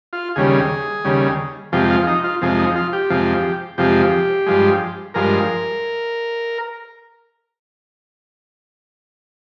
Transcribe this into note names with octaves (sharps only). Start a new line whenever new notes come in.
F4
D#2 C#3 G3 G#4
D#2 C#3 G3
F2 C3 F3 G#3 G4
F4
D#4
F4
F2 C3 F3 G#3
D#4
F4
G4
F2 C3 F3 G#3
F2 C3 F3 G#3 G4
G2 F3 G#3
G2 F3 G#3 A#4